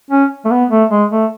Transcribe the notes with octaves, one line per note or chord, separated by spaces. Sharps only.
C#4
A3
B3
A3
G#3
A3